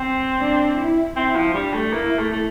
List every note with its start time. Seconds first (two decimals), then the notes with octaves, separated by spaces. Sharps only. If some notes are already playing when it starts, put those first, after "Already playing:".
Already playing: C4
0.39 D4
0.77 E4
1.16 C4 E4
1.35 F3
1.54 G3 D4
1.73 A3
1.92 A#3 E4
2.19 A3
2.33 A3